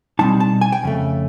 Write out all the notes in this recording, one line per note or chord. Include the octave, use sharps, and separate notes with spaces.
B2 G3 C4 D#4 A5
A5
G#5
G5
F2 C#3 A3